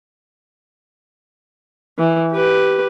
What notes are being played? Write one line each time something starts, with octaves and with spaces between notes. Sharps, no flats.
E3
G4 B4